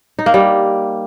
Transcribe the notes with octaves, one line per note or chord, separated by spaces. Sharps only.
D#4
A#3
G3